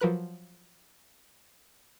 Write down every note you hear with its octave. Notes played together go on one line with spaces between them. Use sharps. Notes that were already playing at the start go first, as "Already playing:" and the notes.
F3 F#3 A#4 B4 F#6